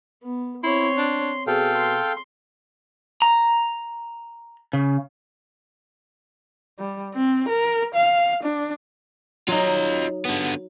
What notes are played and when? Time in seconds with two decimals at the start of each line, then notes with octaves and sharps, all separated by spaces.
0.23 B3
0.64 C4 E4 C#5 C6
0.98 D4
1.47 B2 G#4 A4 F5 G5
1.77 C6
3.22 A#5
4.73 C#3
6.79 G3
7.14 C4
7.49 A#4
7.95 F5
8.44 D4
9.48 F#3 D#4 F4 D#5
10.25 D3 B3